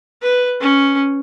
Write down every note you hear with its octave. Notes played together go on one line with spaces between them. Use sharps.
B4
C#4